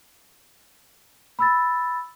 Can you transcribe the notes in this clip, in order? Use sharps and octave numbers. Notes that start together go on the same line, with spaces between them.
B5 E6 A6